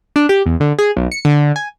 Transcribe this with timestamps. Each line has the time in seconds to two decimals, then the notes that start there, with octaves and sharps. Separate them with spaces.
0.16 D4
0.29 G4
0.46 E2
0.60 D3
0.79 G#4
0.97 B1
1.12 C#7
1.25 D3
1.56 G#5